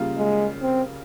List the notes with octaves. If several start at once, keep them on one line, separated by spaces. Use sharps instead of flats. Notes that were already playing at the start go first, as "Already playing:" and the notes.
Already playing: C#3 G3 A#3 F4
G#3
C4